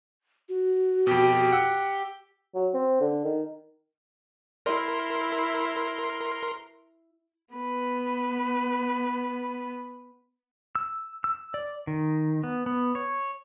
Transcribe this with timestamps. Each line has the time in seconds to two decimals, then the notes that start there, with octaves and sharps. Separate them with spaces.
0.49 F#4
1.07 F2 B2 G4
1.52 F#5 E6
2.55 F#3
2.74 C4
3.00 D3
3.24 D#3
4.66 E4 A#4 C6
7.54 B3 B4
10.75 E6
11.24 E6
11.54 D5
11.87 D#3
12.43 B3
12.66 B3
12.95 C#5